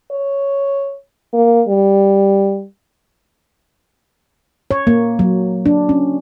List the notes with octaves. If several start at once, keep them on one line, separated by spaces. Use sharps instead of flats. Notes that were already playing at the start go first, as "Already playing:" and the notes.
C#5
A#3
G3
C#5
A#3
F#3
D4
C#4